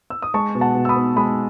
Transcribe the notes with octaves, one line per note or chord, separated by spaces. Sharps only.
E6
D#6
G#3 A5 C#6
B2
F#5 A5
B2
E6
B5 D#6
B3
G#3 B5 D#6